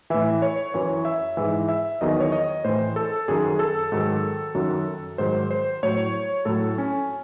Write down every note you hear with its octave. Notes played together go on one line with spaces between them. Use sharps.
A2 E3 E5
C#5
F#2 E3 C#5
E5
G#2 E3 E5
E5
E2 D#3 F#3 D#5
C#5
D#5
A2 E3 C5
A4
F#2 D#3 F#3 G#4
A4
G#2 D#3 F#3
F#2 D#3 F#3
G#2 D#3 F#3 C5
C5
A2 F#3 C#5
A2 F#3 A4
C#4